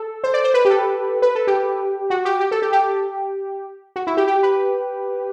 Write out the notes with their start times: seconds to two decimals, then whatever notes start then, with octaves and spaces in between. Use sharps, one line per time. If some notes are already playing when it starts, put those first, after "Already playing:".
Already playing: A4
0.24 C5
0.34 D5
0.44 C5
0.54 B4
0.65 G4
0.70 A4
1.22 B4
1.35 A4
1.47 G4
2.10 F#4
2.25 G4
2.40 G4
2.51 A4
2.62 G4
2.73 G4
3.96 F#4
4.07 E4
4.17 G4
4.27 G4
4.43 B4